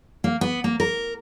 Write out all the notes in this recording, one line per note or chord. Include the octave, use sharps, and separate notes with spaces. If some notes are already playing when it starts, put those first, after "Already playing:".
A#3
B3
A#3
A#4